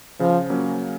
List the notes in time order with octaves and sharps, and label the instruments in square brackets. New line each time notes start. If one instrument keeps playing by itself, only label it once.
[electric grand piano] C#3 [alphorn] F3
[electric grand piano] F#3 A#3 C#4